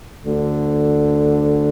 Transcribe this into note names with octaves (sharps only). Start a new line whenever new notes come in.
D2 D3